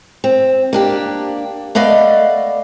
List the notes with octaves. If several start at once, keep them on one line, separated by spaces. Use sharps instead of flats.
C4
A#3 D4 G4
A3 B3 D5 D#5 F5